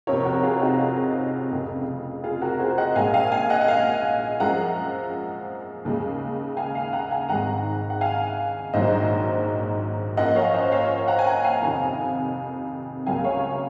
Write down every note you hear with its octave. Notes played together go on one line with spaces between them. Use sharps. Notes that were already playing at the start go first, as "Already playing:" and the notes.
F2 C3 F3 A#4 C#5
F#4 A#4
F4 G#4
D#4 F#4
F4 G#4
F1 F2 C#3
F4 G#4
F#4 A#4
G#4 C5
D#5 F#5
A#1 A#2 G#3 F5 G#5
F5 G#5
F5 G#5
D#5 F#5
F#5
F5 G#5
F#2 F3 G#3 F#5 A#5
D#2 C#3 G#3
F5 G#5
F5 G#5
F#5 A#5
F5 G#5
G#1 G#2 D#3 G#3 F#5 A#5
F#5
F5 G#5
A#1 G#2 D#3 F#3 C5 D#5
F#2 F3 A#3 D#5 F#5
C#5 F5
C5 D#5
C#5 F5
F#5 A#5
G#5
F#5 A#5
F5 G#5
F2 C3 D#3 F5 G#5
C#2 C#3 F#3 A#3 F5 G#5
C#5 F5